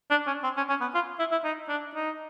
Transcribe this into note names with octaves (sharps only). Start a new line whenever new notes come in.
D4
C#4
C4
C#4
C#4
B3
F4
E4
E4
D#4
D4
D#4